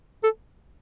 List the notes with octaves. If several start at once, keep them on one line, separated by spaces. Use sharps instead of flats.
A4